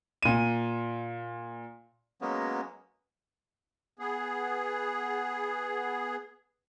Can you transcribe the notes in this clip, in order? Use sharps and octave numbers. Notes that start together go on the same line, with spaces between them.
A#2 D#7
F#3 G#3 A#3 B3 C#4
B3 G#4